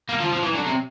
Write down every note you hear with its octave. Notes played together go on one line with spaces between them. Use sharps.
G3 A#3
D3
F3
G3
F3 G#3
E3 F#3
D3
C3